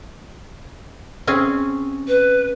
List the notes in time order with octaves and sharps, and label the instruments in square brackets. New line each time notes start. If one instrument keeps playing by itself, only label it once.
[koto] C4 C#4 G#4
[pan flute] B4